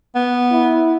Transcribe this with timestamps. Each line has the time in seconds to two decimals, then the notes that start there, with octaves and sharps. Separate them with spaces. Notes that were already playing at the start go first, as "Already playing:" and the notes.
0.15 B3
0.52 E4